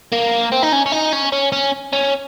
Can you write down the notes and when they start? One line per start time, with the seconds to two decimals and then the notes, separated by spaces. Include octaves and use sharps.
0.12 A#3
0.52 C4
0.63 D#4
0.73 C#4
0.86 C#4
0.92 D#4
1.13 C#4
1.32 C#4
1.52 C#4
1.93 C#4